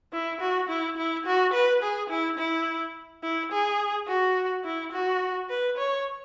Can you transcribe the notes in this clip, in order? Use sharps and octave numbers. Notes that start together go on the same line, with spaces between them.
E4
F#4
E4
E4
F#4
B4
G#4
E4
E4
E4
G#4
F#4
E4
F#4
B4
C#5